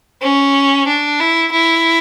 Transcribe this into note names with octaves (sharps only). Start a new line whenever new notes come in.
C#4
D4
E4
E4